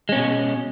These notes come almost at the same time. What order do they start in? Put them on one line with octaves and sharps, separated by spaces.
G#3 C#4 B2